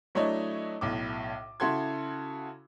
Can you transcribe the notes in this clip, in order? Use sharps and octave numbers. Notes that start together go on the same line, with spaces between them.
F#3 A3 D4 E4 C#5 D#5
B1 A2 D6
C#3 E4 F#4 A4 C6 G#6